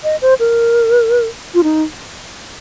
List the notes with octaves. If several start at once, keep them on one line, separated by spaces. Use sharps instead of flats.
D#5
C5
A#4
F4
D#4